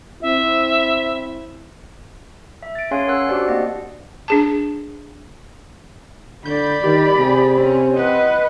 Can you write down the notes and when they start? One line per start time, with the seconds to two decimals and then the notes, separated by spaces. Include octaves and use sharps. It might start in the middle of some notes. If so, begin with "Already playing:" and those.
0.22 C4 E4 E5
2.63 E5
2.75 A6 D7
2.91 C#4 G#4 C#5 F5 G#5 C6
3.07 A#4 F#5 C6 E6 F#6
3.29 D4 F#4 G4 C5 D5
3.47 A#3 C4 D#5 F#5
4.28 D4 G#4 A5
6.46 D3 D5 B5 G6
6.84 D#3 G3 G4
7.18 C3 G#4
7.57 C4 C#4
7.97 B4 D#5 F#5